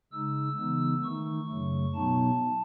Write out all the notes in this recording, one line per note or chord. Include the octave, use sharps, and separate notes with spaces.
C#3 G#3 D#4 E6
C#3 E3 G#3 B3 D#4
D#3 A3 D#4 C#6
F#2 C#3 F#3 A3
B2 F#3 B3 D#4 A5